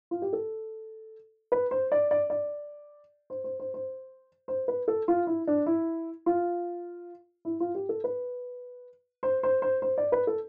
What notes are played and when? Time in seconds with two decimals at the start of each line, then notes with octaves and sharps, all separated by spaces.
0.11 F4
0.22 G4
0.33 A4
1.52 B4
1.71 C5
1.92 D5
2.11 D5
2.30 D5
3.30 C5
3.44 C5
3.60 C5
3.74 C5
4.48 C5
4.68 B4
4.88 A4
5.08 F4
5.27 E4
5.47 D4
5.66 E4
6.26 F4
7.45 E4
7.60 F4
7.75 G4
7.89 A4
8.04 B4
9.23 C5
9.43 C5
9.62 C5
9.82 C5
9.98 D5
10.12 B4
10.27 A4